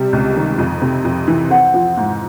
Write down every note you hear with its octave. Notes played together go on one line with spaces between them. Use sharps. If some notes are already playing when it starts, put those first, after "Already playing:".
Already playing: C3 G3
C#2
D#3
F2
C3
F2
E3
C4 F#5
F3
G#2